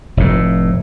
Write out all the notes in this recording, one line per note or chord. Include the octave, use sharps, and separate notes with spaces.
F1 A2